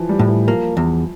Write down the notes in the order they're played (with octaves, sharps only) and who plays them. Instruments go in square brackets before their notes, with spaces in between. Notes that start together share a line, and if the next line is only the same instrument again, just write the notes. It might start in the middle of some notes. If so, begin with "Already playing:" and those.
Already playing: [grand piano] E3 F3
G3
[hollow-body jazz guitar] A2
[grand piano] E3
[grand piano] F3 [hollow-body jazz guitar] A#3
[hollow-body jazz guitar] E2